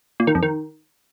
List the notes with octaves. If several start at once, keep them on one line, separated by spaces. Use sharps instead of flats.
A#2
D#3
F2
D#3